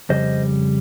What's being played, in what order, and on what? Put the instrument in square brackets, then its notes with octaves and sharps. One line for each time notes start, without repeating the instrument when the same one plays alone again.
[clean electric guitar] F2 C#3 G3 C5 D#5